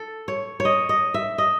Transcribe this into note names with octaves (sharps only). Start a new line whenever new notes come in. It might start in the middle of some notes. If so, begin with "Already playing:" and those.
Already playing: A4
C#5
C#5
D#5
D#5
E5
D#5